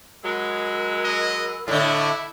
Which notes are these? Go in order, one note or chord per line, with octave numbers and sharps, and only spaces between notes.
F#3 G#3 A#4 B5 E6
D#5
A2 D3 E4 A4 C#5 D#5